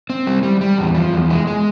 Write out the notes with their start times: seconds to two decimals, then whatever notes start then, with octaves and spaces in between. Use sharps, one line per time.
0.10 C4
0.27 G3
0.43 G3
0.61 G3
0.78 E2
0.95 F3
1.13 E2
1.30 G#3
1.47 G#3